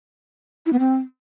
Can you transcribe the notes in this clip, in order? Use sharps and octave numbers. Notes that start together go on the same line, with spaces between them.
E4
B3
C4